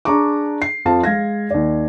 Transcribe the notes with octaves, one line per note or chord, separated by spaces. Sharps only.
D4 G#4 A#5 C#6 D6
C7
F2 F3 F5 A5
G#3 F5 G#6 A#6
D#2 D5